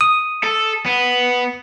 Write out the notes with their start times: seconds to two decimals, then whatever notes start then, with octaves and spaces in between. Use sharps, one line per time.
0.01 D#6
0.43 A4
0.86 B3